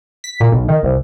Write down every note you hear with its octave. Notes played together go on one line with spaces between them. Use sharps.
B6
A#2
B1
D#3
C2